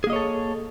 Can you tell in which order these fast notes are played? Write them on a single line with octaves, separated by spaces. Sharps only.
G#4 A#3 D#5 C#5 A4